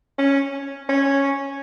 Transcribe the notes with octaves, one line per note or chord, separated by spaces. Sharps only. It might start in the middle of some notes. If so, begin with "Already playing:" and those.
C#4
C#4